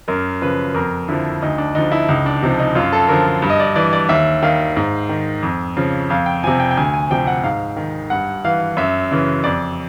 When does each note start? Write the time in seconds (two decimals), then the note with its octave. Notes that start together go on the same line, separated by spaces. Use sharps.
0.08 F#2 A#4
0.42 C#3 F3 B4
0.74 F2 A#4
1.08 D3 F3 E4
1.42 D2 D#4
1.58 D4
1.75 D3 F3 D#4
1.92 E4
2.09 C#2 D#4
2.26 D4
2.43 C3 F3 D#4
2.59 D#4
2.75 F#2 F4
2.93 A4
3.09 D3 F3 A#4
3.42 G2
3.50 D#5
3.60 D5
3.76 E3 D5
3.93 D5
4.09 D#2 E5
4.43 D#3 F5
4.77 G#2
5.09 D#3
5.43 F2
5.77 C#3 F3
6.10 F2 F5
6.26 G5
6.44 C3 F3 G#5
6.60 G5
6.71 G5
6.77 D2 G#5
6.94 G#5
7.11 C3 F3 G5
7.27 F#5
7.44 G#2 F5
7.77 D#3
8.10 G2 F#5
8.45 E3 F5
8.77 F#2 E5
9.11 C#3 E3
9.44 F2 D5